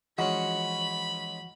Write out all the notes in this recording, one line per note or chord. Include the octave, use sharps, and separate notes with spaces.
E3 F3 G#3 C#4 F#4 B5